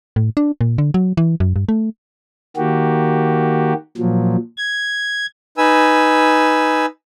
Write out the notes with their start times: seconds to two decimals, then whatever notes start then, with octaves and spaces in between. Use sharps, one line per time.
0.16 A2
0.37 D4
0.61 A#2
0.78 D3
0.94 F#3
1.17 E3
1.40 F#2
1.56 G2
1.69 A3
2.57 D#3 A#3 F#4 G4
3.97 A#2 F3 F#3
4.57 G#6
5.58 D#4 B4 G#5 E6